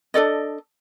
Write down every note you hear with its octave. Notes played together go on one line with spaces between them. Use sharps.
D4 A4 D5 D#5